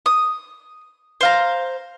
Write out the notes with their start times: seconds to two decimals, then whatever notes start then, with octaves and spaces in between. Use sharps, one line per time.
0.06 D#6
1.21 C5 F5 A#5